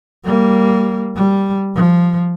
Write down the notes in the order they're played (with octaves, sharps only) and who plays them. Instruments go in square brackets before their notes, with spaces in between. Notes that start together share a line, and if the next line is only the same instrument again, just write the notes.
[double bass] G3 A#3
G3
F3